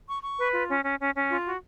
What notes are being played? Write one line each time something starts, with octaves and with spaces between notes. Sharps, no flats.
C#6
C#6
B4
F4
C#4
C#4
C#4
C#4
F4
F#4